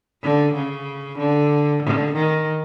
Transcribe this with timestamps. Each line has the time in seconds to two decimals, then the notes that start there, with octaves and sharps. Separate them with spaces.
0.23 D3
0.54 C#3
1.18 D3
1.83 D3
2.15 D#3